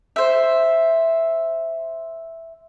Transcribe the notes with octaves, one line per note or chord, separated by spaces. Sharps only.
C5 E5